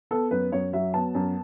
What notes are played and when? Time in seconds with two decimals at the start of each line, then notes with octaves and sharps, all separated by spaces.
0.11 B3 A4
0.31 F#2 B4
0.52 F#2 C#5
0.73 F#3 E5
0.94 B3 A5
1.15 F#2